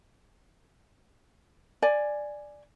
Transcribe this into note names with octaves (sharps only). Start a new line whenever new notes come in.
D5 G#5